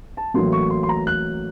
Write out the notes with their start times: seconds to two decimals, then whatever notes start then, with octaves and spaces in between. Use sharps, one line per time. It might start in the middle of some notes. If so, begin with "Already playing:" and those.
0.17 A5
0.34 A1 A2 F#3 A#3 C6
0.52 C#6
0.70 C6
0.83 C6
0.89 A#5
1.07 F#6